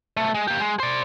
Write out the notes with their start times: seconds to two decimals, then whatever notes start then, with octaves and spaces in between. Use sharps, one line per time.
0.17 B1 A3
0.34 G#3
0.48 A#3 G4
0.60 G#3
0.80 C5 D5